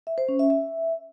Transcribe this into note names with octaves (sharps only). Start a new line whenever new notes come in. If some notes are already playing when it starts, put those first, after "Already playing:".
E5
C5
C#4
E5
E5